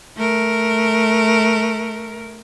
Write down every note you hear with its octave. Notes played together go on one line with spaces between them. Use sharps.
A3 A#4